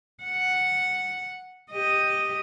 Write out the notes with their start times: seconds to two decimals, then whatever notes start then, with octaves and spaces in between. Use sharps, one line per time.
0.23 F#5
1.71 G4 D#5